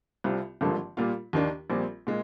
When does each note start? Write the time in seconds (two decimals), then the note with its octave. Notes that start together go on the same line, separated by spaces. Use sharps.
0.24 C2 C3 G3 C4 F4
0.61 G#1 G2 D3 F3 A#3
0.97 A#2 G3 A#3 F4
1.33 D#2 D#3 A#3 D4
1.70 A#1 A#2 G3 C4
2.07 A#2 G#3